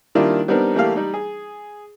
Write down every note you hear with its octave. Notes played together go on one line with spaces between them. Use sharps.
D#3 G3 A#3 D4 E4 F4
G3 B3 C4 D4 D#4 A#4
E3 G3 A3 A#3 G4 F5
G3 D#4
G#4